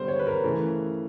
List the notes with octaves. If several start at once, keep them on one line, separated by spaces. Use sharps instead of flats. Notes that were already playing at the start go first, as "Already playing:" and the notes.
Already playing: D3 G3 B3 C5
C#5
B4
A#4
C#3 E3 A3